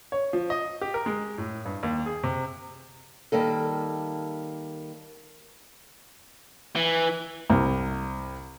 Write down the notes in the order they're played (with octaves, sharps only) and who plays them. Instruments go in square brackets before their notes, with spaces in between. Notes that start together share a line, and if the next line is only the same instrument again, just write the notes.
[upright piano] C#5
F3
D#5
G4
A#4
G#3
A2
G2
D#2
G#4
C3
[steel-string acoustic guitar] D#3 G3 A#3 A4
[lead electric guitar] E3
[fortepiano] C2